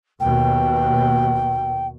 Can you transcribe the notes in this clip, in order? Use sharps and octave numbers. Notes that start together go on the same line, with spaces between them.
D#2 B2 G5